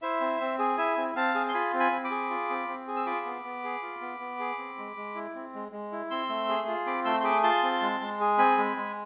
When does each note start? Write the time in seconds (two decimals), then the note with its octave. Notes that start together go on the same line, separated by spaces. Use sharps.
0.02 E4 C5 E5
0.21 C4
0.41 C4
0.59 G#4
0.78 E4 E5 G#5
0.97 C4
1.16 C4 F5 A5
1.35 G#4
1.49 C6
1.54 F4 G#5 B5
1.74 C4
1.80 G#5 B5
1.92 C4
2.04 B5 D6
2.11 G#4
2.30 F4
2.50 C4
2.68 C4
2.88 G#4
2.96 E6
3.06 F4 B5 D6
3.26 B3
3.44 B3
3.64 G#4
3.82 F4
4.01 B3
4.20 B3
4.39 G#4
4.58 C4
4.78 G#3
4.97 G#3
5.15 E4
5.35 C4
5.54 G#3
5.72 G#3
5.92 E4
6.10 C4 C6 E6
6.29 A3
6.49 G#4
6.68 F4
6.86 C4 B5 D6
7.05 A3 C6 E6
7.20 C6
7.24 G#4 B5 D6
7.43 F4 A5 C6
7.63 C4
7.82 G#3
8.01 G#3
8.20 G#4
8.38 C4 G#5 B5
8.58 G#3
8.77 G#3